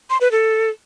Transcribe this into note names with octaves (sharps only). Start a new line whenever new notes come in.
C6
B4
A4